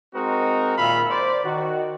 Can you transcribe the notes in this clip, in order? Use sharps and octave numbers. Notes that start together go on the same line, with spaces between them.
G#3 C4 D#4 F#4 A#4
A#2 D#3 E5 F5 B5
C5 D5
D#3 F#4